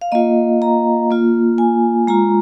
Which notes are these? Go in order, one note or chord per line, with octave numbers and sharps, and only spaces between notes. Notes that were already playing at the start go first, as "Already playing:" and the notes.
F5
A#3 F4 D#5
A#5
A#3 F4
G#5
G#3 F4 A#5